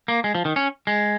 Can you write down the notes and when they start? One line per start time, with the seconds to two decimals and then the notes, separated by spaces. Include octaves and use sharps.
0.08 A#3
0.24 G#3
0.35 F3
0.45 D#3
0.56 C#4
0.87 G#3